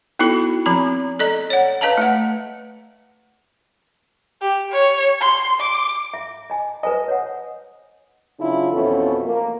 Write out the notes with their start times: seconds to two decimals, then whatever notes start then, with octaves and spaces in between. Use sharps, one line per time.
0.19 B3 D#4 E4 F#4 A4
0.66 F3 C4 A#5 B5
1.19 A4 D5 D#5 A#5
1.50 C#5 F#5
1.81 B4 D#5 F5 A5 A#5
1.98 A3 F#5
4.42 G4
4.72 C#5
5.20 C6
5.60 D6
6.14 E5
6.50 D#5 G#5
6.83 B4 C5 D#5 G#5
7.08 C#5 F#5
8.39 C#3 F#3 D4 E4 F4
8.71 F2 B2 E3 C#4 F4 A4
9.25 A#3